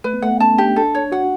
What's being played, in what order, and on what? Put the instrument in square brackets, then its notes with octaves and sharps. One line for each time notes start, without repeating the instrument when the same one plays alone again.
[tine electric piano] A3 [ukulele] B4
[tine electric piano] B3
[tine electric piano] A3 [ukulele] F#5
[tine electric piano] B3
[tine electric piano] C#4 [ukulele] A5
[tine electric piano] D4 [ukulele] G4
[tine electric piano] D4 [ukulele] A4
[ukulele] C#5
[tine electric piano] F#4 [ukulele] F#5